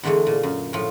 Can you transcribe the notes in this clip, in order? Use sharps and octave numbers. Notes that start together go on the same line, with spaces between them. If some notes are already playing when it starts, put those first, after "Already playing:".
E2 D3 E3 G#3 A3
A#2
F#2
A2 F3